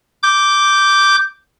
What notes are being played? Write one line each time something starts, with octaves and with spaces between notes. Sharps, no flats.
D6 G6